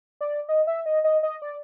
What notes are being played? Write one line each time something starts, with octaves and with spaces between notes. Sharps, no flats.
D5
D#5
E5
D#5
D#5
D#5
D5